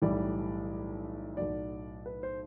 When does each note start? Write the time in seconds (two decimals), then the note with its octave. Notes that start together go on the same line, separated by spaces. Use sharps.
0.02 B1 A2 E3 G3 D5
1.37 B1 A2 F#3 D5
2.06 B4
2.23 C5